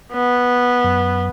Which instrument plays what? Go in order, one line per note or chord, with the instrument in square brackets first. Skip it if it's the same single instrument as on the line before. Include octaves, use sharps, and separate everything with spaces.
[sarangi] B3
[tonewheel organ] F#2